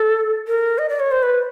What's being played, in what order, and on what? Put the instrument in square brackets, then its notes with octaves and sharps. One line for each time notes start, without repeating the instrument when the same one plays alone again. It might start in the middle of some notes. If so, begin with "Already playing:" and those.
Already playing: [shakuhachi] A4
A#4
D#5
D5
C#5
C5
B4